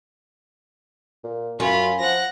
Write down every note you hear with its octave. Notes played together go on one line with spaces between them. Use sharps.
A#2
F#2 C#4 F4 B5
F3 F#5 A#6